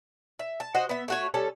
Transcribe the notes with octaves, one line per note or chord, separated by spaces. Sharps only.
E5
A5
F#4 C5 D#5
B3 E5
A3 F#4 C#5
G3 C#4 A4